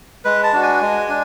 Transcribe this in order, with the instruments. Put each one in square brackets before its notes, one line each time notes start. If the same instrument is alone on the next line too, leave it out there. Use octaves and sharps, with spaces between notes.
[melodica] G#3 B4
A5
D4 F#4
G#5
G#3
D4